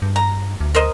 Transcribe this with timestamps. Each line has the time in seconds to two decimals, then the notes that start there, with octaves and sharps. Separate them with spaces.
0.02 G2
0.16 A#5
0.61 D2
0.75 A#4 C5 D#5